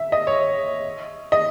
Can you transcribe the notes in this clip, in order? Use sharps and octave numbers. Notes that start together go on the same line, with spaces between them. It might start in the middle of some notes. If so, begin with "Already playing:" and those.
Already playing: E5
D#5
C#5
D#5